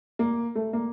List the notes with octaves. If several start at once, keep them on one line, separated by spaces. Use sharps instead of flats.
A#3
A3
A#3